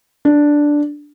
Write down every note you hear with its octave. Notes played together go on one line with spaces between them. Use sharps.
D4